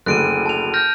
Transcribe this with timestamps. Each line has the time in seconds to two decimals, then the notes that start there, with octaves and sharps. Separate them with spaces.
0.06 F#1 D2 F#6 D7 D#7
0.46 A5 F7
0.74 F6 G6 A#6